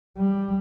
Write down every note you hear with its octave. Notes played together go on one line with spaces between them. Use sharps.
G3